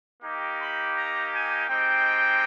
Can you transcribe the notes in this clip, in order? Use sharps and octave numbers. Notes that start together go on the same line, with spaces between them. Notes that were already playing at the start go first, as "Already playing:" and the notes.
A#3 D#4 G4
B5
A#5
G#5
G#3 C4 D#4 G4 G5